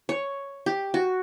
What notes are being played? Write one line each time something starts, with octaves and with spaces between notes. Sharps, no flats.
C#5
G4
F#4